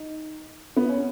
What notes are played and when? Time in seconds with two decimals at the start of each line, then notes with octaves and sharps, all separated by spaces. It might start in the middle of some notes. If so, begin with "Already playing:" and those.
Already playing: D#4
0.76 B3
0.89 C#4